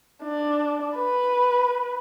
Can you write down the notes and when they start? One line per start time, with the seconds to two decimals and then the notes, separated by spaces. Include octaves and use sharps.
0.23 D4
0.97 B4